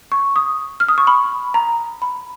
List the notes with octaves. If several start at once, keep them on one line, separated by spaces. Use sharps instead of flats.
C#6
D#6
F6
D#6
C#6
B5
A#5
B5